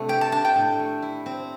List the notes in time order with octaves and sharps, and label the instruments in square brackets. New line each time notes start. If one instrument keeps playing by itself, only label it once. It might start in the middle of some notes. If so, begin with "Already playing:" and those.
Already playing: [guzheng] C3 A3 D4
[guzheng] G4 [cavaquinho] G5
[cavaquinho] A5
[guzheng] D4 [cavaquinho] A5
[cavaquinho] G5
[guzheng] A2
A3
E4
C4